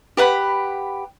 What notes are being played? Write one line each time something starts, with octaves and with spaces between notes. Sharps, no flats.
G4 B4 F#5 B5